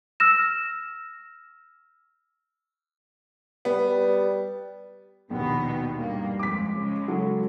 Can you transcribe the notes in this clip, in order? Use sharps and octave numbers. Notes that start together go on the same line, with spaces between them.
E6 F6 A#6 E7
G3 B3
G3
A#1 D#2 B2 D#3 B3
G2 A#3
F2 G#3 D6 B6
C#3 G#3
F#3 A4